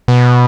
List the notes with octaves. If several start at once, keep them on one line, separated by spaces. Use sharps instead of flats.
B2